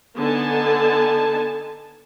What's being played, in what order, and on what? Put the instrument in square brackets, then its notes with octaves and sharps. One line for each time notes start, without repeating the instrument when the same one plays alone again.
[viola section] D3 B3 D#4 G#5 A5